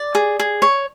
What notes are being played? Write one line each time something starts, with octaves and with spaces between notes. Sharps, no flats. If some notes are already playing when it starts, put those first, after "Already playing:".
Already playing: D5
G#4
G#4
C#5